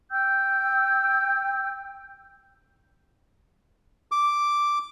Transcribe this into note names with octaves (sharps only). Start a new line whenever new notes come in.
G5 E6 G6
D6